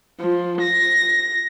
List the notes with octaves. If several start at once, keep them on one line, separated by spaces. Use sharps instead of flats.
F3
A#6